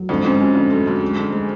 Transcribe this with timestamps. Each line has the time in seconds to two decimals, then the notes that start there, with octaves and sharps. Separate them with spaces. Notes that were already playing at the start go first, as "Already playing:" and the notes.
Already playing: F#3
0.09 F2 G#2 D3
0.24 F2 G#2 C#4
0.35 G#2
0.40 F#2 C#4
0.55 F2 D3
0.71 F#2 A3
0.87 F#2 D3
1.02 G#3
1.18 D3
1.33 G#3